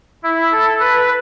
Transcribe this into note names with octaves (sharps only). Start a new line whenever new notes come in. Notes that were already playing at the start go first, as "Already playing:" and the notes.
E4
A4
B4